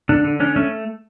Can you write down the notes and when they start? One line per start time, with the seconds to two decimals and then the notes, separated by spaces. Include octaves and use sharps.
0.09 D3 D4
0.24 D3
0.40 C#4 D4
0.56 A3 C#4